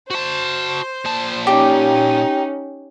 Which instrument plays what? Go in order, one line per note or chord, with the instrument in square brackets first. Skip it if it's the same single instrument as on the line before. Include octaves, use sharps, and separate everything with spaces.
[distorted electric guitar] F#4 A5 [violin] C5
[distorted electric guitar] A#2 A5
[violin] C#4 D#4 [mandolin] G4